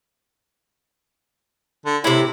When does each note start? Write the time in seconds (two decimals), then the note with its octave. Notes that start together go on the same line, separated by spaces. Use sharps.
1.86 D3
2.04 A2 C3 E4